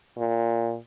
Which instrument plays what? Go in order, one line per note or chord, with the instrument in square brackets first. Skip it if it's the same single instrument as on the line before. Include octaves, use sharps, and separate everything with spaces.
[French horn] A#2